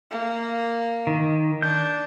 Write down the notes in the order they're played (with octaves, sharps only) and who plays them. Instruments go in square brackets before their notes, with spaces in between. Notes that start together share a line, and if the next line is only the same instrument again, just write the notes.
[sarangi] A#3
[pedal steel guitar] D#3
[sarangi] D4 [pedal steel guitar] G6